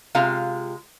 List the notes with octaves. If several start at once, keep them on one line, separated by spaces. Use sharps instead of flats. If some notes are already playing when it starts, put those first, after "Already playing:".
C3 G#3 F4 F5 A#5